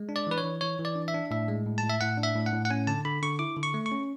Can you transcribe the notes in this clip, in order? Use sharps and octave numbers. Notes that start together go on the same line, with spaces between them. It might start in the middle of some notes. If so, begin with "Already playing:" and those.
Already playing: G#3
D4
D5
E3 B4
C#5
E3
E3 C#5
E3
D5
D4
E5
D4
A2 E5
G#3
A2
A5
A2
E5
A2 F#5
D4
E5
A2
F#5
A2
F#5
C#4 G#5
D3 A5
D3 B5
D3 C#6
E4 D6
D3
C#6
A3
C#6
C#4